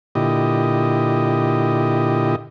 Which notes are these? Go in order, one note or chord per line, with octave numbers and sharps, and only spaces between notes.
A#2 D3 E4 G4 D#5